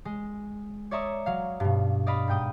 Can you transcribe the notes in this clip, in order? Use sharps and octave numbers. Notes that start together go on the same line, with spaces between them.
G#3
C#5 D5 E5 A#5 C#6 D#6
F#3 F5
G2 B2
D5 D#5 F5 B5
G#2 G5 D#6